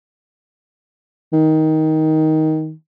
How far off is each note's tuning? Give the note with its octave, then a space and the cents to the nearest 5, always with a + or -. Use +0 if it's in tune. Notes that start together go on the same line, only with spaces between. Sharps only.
D#3 +15